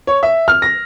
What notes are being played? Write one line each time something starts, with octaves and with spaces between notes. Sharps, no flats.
C#5
E5
F6
A#6